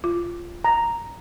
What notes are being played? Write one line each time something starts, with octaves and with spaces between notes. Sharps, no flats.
F4
A#5